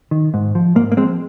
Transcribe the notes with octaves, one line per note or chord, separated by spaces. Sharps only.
D#3
G#2
F3
G#2 A#3
A#3
F3 G#3 C4